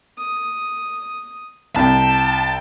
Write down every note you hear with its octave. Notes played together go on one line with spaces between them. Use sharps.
D#6
C2 G5 A5